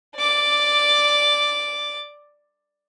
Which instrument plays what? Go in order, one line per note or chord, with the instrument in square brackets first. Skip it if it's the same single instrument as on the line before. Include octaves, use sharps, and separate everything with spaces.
[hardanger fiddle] D5 D6